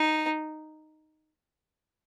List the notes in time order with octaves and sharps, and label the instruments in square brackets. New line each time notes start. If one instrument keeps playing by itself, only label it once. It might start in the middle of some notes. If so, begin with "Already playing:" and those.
Already playing: [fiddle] D#4